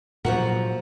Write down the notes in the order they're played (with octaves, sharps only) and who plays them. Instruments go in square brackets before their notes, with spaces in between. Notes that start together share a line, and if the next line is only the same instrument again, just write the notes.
[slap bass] A#2 F#3 [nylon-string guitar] F3 F#4 A#4 [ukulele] F#5